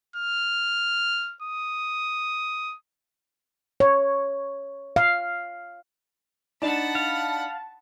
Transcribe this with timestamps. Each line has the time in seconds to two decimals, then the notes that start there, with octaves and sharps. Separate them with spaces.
0.16 F6
1.42 D#6
3.80 C#5
4.96 F5
6.62 D4 D#4 F#5 A5 B5
6.95 F5